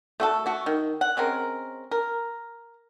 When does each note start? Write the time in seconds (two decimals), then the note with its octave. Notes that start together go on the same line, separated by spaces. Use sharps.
0.20 A3 F#4 A4
0.46 A3 F#4
0.66 D#3
1.01 F#5
1.17 G#3 C4 C#4 A#4
1.91 A#4